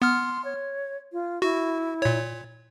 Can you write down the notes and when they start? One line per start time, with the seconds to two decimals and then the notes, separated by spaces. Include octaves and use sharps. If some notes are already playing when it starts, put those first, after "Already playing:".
0.02 B3 C6 F6
0.45 C#5
1.12 F4
1.42 E4 F#4
2.02 A#2 C#5